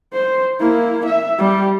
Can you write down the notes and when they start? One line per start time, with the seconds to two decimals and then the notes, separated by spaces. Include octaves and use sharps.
0.13 C5
0.60 A#3 E4
1.06 E5
1.38 G3 G4